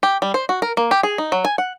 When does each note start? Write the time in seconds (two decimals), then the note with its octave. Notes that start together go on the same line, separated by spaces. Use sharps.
0.03 G4
0.22 G3
0.34 C5
0.49 F#4
0.62 A#4
0.77 A#3
0.91 G4
1.03 G#4
1.18 D#4
1.32 F#3
1.45 G#5
1.58 F#5